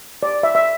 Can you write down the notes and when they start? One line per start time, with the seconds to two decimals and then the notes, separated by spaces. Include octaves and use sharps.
0.23 D5
0.43 E5
0.55 E5